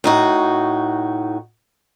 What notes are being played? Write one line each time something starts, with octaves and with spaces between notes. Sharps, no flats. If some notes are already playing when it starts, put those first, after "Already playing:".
A2 D#4 F#4